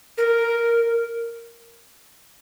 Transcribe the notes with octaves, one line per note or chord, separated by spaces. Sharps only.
A#4